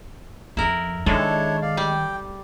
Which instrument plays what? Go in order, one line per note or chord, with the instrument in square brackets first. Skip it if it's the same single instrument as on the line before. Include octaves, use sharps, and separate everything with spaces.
[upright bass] F2 [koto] E4 A#4
[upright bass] D#3 [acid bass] G#3 [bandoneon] D4 E4 C#5 [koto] A4
[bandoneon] D5 F5
[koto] G3 [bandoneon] G5